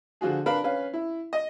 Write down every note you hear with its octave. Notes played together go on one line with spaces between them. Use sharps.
D3 F3 F4 F#4 G#4
D4 A#4 B4 F5 B5
C#4 B4 F5
E4
D#5